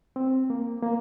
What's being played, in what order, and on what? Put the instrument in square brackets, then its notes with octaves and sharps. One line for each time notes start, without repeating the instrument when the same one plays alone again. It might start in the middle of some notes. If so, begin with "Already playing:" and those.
[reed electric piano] C4
A#3
A#3